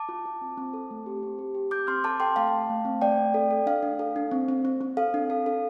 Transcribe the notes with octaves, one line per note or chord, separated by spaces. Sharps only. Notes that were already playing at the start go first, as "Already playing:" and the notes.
Already playing: A5 D6
F4
F4
C4
C4
A4
A3
G4
C4
G4
G4
C4 D6 G6
C4 C6 F6
A4 A5 D6
A4 G5 C6
A3 F5 A5
A3
A3
C4
A3 D5 G5
A3
A4
A4
D4 F5
D4
A4
D4
C4
C4
C4
C4
A4 F5
D4
A4
A4